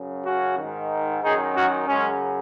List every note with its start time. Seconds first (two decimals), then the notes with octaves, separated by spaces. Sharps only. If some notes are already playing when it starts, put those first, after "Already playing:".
Already playing: F#2 C#3
0.25 C#4 F#4
0.58 G#2 D#3
1.22 F#2 D#3 D#4 G#4
1.55 C#4 F#4
1.87 F#2 C#3 G#3 C#4